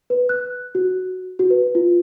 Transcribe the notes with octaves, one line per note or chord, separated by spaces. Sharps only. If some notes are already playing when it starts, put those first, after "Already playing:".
B4
F#6
F#4
F#4
B4
F4